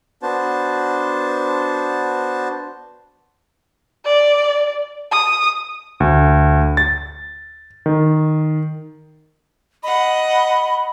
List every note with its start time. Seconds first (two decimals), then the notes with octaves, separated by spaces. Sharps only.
0.22 B3 D4 F#4 C5 A5
4.05 D5
5.12 D#6
6.00 D2
6.77 A6
7.86 D#3
9.83 D#5 F#5 B5